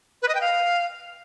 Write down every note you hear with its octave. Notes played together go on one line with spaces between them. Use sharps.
B4
D#5
G5
F5